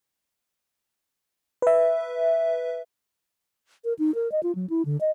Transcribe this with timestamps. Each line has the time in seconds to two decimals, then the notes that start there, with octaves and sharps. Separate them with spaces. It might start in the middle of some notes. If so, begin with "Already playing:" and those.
1.62 B4 E5
3.85 A#4
3.99 D#4
4.15 A#4
4.32 D#5
4.43 F4
4.55 F#3
4.70 E4
4.85 D3
5.01 D#5